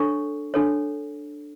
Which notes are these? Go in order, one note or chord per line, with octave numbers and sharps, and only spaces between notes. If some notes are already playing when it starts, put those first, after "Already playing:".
Already playing: D4 A4 C#5 C#6
D4 A4 C#5